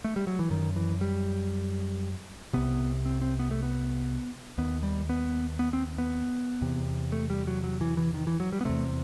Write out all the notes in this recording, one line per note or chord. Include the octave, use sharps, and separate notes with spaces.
A3
G3
F#3
E3
F#2 D#3
E3
G3
C2 C3 B3
C4
C4
B3
A3
B3
D#2 B3
G3
B3
B3
C4
B3
E2 C3
A3
G3
F#3
F#3
E3
E3
D#3
E3
F#3
G3
B3
E2 C3 A3